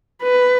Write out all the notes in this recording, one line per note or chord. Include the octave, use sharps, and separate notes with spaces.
B4